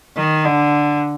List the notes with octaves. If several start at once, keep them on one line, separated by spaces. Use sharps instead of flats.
D#3
D3